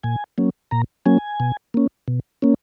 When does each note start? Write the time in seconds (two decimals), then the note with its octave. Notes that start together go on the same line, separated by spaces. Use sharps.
0.03 A#2 G#5
0.38 F#3 A#3 C#4
0.71 A#2 A#5
1.06 F#3 A#3 C#4 G#5
1.40 B2
1.74 A#3 C#4
2.08 B2
2.42 A#3 C#4